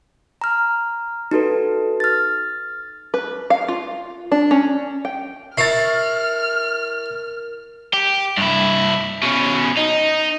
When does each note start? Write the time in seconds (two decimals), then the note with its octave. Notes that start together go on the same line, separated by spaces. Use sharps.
0.41 A#5 F6
1.31 D#4 F#4 A4 B4
2.00 F6 A6
3.14 B4
3.50 F5
3.68 F4
4.32 D4
4.51 C#4
5.05 G5
5.58 E4 A#4 C#5 F6 A6 C7
7.94 G4
8.37 G2 E4
9.23 B2 C#4
9.77 D#4